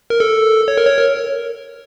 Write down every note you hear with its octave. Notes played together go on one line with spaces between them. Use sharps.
A#4
A4
C#5
A#4
C#5
A#4